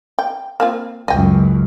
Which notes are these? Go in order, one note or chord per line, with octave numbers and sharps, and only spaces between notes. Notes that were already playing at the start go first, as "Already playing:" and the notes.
G5
A#3 C4 F4
C#2 F#2 D#5 G5